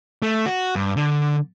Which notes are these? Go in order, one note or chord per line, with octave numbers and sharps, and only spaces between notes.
A3
F#4
G2
D3